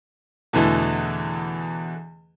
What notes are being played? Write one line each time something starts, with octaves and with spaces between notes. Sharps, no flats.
E2 B2 D3 E3 A3